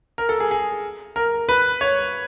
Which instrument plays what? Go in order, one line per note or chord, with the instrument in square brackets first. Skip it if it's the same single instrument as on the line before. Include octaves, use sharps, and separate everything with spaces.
[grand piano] A#4
A4
G#4
G#4
A#4
B4
C#5